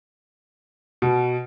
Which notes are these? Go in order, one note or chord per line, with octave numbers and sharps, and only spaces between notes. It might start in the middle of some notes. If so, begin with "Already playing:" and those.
B2